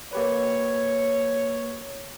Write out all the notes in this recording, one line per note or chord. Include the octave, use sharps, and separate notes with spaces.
A#3 G4 B4 C#5